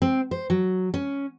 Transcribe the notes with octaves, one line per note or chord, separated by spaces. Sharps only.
C4
C5
F#3
C#4